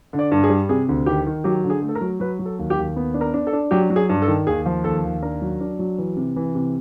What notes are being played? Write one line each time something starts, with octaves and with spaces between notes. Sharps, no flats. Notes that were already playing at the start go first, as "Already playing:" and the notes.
D3
D5
G2
G#4
G3
C3 G#4
D2
D#3 G4
D#3
F#3 G4
D3
G#4
A3
A4
A#4
F#3
F#3 B4
F#3
A4
D#2
G4
D#2
B3
D4
A#4
D4
A4
D4
F#3 G4
F#3
G#4
G2
A4
D#3
D#2 G#4
F3
D#2 A4
D#2
D4 A#4
F#3
D4
F#3
E3
C3
E3
C3